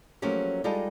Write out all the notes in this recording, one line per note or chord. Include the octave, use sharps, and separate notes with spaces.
F3 F#3 A3 A#3 C#4 G4
G3 G#3 D#4 F4 G4 A4